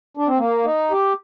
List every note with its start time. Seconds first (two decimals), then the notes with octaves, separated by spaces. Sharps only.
0.17 D4
0.28 C4
0.38 A#3
0.65 D#4
0.91 G4